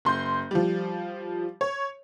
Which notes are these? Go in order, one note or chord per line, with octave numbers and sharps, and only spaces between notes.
F#1 C6 G6
F3 G3
C#5